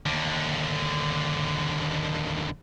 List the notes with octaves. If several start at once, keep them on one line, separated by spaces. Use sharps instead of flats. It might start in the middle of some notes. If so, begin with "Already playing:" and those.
D#2 D3